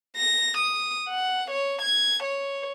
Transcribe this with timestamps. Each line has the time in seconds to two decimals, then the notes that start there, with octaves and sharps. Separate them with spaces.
0.17 A#6
0.58 D#6
1.08 F#5
1.51 C#5
1.82 G#6
2.23 C#5